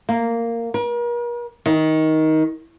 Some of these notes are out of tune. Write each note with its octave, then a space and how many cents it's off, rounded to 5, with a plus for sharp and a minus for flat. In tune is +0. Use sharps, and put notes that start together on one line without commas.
A#3 -10
A#4 +45
D#3 +15